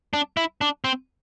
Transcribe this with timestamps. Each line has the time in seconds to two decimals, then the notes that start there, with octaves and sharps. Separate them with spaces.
0.14 D4
0.37 E4
0.61 D4
0.84 C4